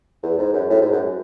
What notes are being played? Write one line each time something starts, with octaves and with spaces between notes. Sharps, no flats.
E2
G#2
F#2
A2
G#2
F#2